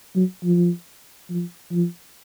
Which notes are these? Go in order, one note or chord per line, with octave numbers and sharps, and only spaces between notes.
F#3
F3
F3
F3